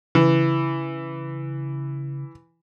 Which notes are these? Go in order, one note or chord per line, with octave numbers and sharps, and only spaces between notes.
C#3 E3